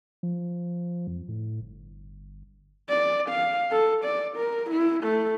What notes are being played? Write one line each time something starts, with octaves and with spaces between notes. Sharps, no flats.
F3
F2
A2
G1
D5
F5
A4
D5
A#4
E4
A3